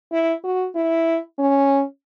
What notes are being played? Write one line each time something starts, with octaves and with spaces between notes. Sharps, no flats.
E4
F#4
E4
C#4